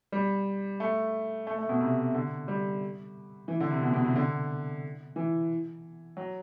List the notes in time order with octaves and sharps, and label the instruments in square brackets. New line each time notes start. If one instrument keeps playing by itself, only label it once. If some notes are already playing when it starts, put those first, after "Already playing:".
[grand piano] G3
A3
A3
A3
B2
C3
D3
G3
E3
D3
C3
B2
B2
C3
D3
E3
F#3